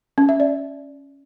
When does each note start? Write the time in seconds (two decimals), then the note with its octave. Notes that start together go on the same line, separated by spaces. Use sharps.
0.18 C#4
0.29 E5
0.40 D5